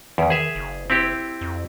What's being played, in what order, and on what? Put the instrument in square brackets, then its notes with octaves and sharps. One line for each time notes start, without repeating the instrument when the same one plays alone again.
[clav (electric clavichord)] E2 [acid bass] D#3
[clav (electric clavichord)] G#4 E5
[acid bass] F#1
[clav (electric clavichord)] C4 E4 G4
[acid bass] F2